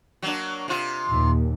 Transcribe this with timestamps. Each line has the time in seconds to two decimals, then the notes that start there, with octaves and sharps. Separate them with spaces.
0.22 F#3 A#3 D4
0.68 C3 F4
1.09 D#2 A#2